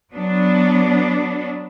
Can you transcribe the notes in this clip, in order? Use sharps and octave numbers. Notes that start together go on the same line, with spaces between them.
F#3 B3 D4